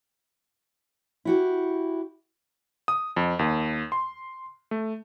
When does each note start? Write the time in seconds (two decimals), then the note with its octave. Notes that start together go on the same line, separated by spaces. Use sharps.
1.25 E4 F#4 G4
2.88 D#6
3.17 F2
3.39 D#2
3.92 C6
4.71 A3